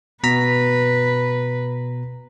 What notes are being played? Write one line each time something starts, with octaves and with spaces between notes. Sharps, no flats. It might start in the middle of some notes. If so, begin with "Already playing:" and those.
B2 B4 A#5 B6